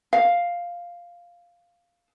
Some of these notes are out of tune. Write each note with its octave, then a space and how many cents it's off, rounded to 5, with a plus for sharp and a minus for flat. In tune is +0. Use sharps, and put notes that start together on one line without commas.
F5 +0